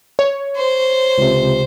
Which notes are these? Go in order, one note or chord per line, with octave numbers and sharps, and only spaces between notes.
C#5
C5
C#2 C3